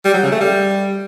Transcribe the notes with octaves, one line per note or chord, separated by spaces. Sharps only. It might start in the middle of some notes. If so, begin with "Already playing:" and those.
G3
F#3
C#3
A3
G3